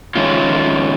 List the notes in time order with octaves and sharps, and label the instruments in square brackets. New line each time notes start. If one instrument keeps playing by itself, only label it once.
[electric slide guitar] D#3 G#3 C#4 F4